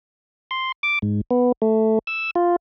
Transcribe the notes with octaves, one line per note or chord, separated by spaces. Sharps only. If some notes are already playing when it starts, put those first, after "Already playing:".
C6
D6
G#2
B3
A3
E6
F4